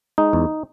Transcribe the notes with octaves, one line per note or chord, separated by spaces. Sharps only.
G#3 D#4
E2